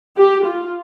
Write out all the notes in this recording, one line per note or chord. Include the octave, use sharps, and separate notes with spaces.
G4
F4